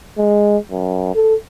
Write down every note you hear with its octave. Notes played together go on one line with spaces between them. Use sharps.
G#3
F#2
A4